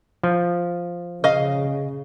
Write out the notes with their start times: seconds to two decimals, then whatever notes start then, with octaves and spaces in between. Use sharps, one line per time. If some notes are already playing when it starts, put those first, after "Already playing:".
0.23 F3
1.24 C#3 D#5 F5